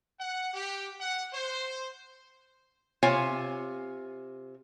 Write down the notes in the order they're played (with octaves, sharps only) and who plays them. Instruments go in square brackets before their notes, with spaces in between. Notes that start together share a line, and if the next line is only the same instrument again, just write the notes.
[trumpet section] F#5
G4
F#5
C5
[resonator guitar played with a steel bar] C3 F4 C#5 G#5